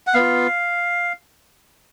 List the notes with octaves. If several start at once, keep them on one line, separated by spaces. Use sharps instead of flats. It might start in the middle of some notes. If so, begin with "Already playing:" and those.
F#5
B3 F4 F5